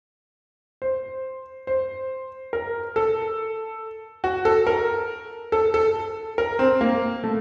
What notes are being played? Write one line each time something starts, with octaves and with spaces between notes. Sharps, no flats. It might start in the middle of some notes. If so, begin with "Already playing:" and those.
C5
C5
A#4
A4
F#4
A4
A#4
A4
A4
A#4
C4
A#3
A3